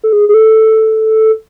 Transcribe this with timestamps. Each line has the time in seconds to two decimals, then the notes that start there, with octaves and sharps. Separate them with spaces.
0.04 A4
0.13 G#4
0.29 G#4
0.34 A4